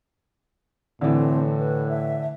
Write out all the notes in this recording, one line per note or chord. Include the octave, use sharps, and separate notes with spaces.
A2 D3 E3 C4
B4
E5